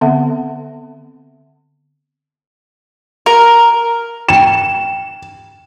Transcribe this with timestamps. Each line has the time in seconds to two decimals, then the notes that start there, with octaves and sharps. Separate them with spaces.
0.01 D3 B3 C4 A4 E5 F#5
3.26 A#4
4.29 G5 C#6 E7